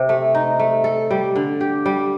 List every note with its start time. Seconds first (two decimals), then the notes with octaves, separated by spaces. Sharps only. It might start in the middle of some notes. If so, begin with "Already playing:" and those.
Already playing: C3
0.09 A3
0.35 D#4
0.59 A3
0.84 A4
1.11 G3
1.36 D3
1.61 G4
1.86 G3